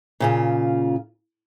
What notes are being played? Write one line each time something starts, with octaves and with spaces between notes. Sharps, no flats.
A#2 C#3 F4